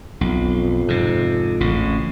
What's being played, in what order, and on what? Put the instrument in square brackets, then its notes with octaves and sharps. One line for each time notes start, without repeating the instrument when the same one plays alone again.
[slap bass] B1 [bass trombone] F2
[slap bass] G#2 C3
A1 C#3